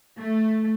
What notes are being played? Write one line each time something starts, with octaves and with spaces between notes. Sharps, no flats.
A3